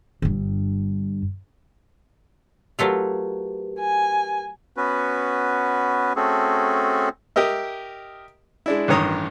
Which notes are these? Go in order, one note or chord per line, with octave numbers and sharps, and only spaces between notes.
G1 G2
F#3 A3 F4 G4 A#4 B4
G#5
B3 C#4 F#4 B4
A3 C4 C#4 F#4 G#4 A4
G4 A#4 D#5 E5
G#3 D4 E4
A1 G2 D#3 C#5 A#5 D#6